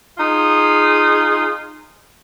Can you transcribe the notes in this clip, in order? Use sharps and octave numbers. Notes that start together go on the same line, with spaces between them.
D#4 F4 G#4